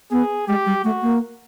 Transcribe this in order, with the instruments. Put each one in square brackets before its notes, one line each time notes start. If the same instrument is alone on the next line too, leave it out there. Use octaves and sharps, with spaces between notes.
[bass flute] B3 [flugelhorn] G#4
[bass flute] G#3 [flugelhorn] G4
[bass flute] G3
[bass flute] A3 [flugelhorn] F#4
[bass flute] A#3